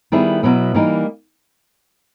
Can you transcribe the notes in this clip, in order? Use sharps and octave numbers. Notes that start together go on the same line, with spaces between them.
D#3 G3 B3 E4 G#4
B2 F#3 B3 E4
E3 G3 A#3 D#4